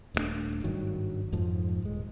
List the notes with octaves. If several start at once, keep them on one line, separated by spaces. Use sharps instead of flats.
D#1 G2 A3 D4
G#1 G2 D#3 F#3
F2 G#2 F3
D#1 G#3